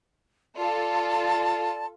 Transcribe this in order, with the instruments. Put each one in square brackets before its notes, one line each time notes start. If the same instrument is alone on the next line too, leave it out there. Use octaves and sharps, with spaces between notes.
[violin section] F4 A4 [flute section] D5 A5